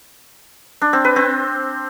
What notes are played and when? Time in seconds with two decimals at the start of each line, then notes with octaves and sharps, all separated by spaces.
0.82 D4
0.93 C4
1.05 B4
1.16 C4